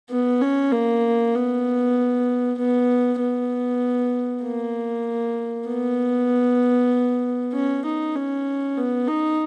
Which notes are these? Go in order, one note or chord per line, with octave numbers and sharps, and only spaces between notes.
B3
C#4
A#3
B3
B3
B3
A#3
B3
C#4
D#4
C#4
B3
D#4